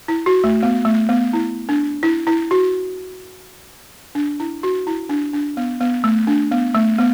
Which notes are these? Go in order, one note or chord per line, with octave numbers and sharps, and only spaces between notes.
E4
F#4
A3
B3
A3
B3
E4
D4
E4
E4
F#4
D4
E4
F#4
E4
D4
D4
B3
B3
A3
D4
B3
A3
B3